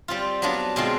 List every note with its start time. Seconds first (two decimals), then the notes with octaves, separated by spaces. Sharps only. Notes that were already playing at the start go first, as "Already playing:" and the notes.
0.08 G3 C4 F4
0.42 F#3 B3 D4 F4
0.76 B2 G#3 C4 F4